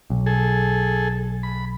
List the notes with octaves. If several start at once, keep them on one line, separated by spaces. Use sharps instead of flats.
B1
G#4 A4
B5